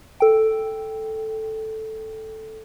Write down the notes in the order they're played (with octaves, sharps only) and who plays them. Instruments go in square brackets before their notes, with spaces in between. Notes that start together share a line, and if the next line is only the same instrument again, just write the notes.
[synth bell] A4 G5